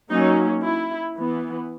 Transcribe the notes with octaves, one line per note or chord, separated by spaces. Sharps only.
F#3 A#3 C#4 D#4
E4
E3 B3